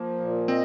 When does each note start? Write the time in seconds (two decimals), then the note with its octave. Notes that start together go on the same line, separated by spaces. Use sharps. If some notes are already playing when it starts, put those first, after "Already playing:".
Already playing: F3 A#3
0.20 A#2
0.48 C4 D#5